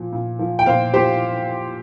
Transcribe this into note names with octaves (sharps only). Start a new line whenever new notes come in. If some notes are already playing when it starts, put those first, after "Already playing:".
Already playing: A#2 F3
A#2
F3
G5
A#2 C5 F5
F3 G4 C5